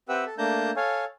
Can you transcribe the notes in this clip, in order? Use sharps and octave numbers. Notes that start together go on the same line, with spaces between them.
C4 G4 B4 E5 F#5 E6
A4
A3 A#3 D4 A5 A#5 G6
A4 C#5 F5 G#5